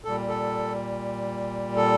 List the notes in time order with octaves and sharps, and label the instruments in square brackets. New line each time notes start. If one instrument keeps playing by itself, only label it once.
[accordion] A#2 G3 A4
A4
A4